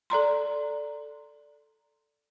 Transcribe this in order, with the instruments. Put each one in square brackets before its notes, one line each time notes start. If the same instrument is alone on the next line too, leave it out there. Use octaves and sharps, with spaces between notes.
[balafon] A4 D5 A#5 C6